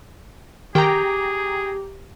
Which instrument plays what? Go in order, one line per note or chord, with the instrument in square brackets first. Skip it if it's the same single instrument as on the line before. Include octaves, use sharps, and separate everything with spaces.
[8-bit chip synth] D#3 [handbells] G4 [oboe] G#4 [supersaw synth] G5 A#5